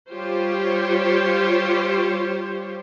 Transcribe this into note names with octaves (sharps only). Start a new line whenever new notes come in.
G3 F4 G4 C5 C#5